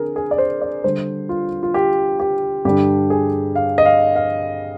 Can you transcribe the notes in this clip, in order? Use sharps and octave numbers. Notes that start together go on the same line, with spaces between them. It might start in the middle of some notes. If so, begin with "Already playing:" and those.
Already playing: D3 C4 G#4 A#4
G#4
D5
C5
D5
D3 G3 D4 C5
F4
F4
G4
G4
G2 D3 G3 D4 G4
G#4
F5
D#5
F5
F5